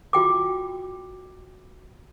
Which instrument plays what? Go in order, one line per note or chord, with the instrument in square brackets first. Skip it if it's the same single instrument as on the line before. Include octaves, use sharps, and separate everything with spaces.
[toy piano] F4 F#4 G5 D6